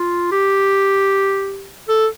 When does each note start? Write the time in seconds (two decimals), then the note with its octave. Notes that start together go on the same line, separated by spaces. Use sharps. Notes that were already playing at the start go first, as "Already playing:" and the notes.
Already playing: F4
0.32 G4
1.89 A4